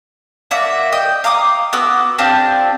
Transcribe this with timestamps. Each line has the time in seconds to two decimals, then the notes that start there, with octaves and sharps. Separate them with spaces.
0.51 A#3 F#4 D5 E5
0.92 D#5 G5
1.24 F5 A#5 D6 D#6
1.73 B3 F#4 D6 E6
2.18 C4 D4 F4 G4